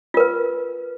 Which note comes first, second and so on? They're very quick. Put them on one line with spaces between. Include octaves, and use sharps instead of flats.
F4 A#4 B4